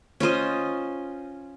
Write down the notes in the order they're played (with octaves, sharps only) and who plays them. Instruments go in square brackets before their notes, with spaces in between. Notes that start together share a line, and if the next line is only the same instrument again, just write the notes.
[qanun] C#4 F4 C5 D#5